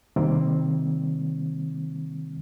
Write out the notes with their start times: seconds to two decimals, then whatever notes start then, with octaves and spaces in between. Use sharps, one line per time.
0.16 C3 D#3 G3 A#3 C4